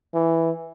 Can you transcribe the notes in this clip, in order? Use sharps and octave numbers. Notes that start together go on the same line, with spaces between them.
E3